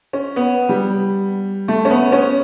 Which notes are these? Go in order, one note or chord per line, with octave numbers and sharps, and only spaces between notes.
C#4
B3
G3
A3
C#4
B3
C#4